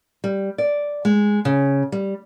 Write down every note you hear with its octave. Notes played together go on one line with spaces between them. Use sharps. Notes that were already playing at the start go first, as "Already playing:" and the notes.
G3
D5
G#3
C#3
G3